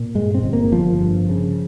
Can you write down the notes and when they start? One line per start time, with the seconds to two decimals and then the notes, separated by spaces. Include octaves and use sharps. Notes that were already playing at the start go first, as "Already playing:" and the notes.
Already playing: A#2
0.15 G2 G#3
0.34 C4
0.43 G1
0.53 A#3
0.72 G1 F3
1.01 G2
1.29 C#3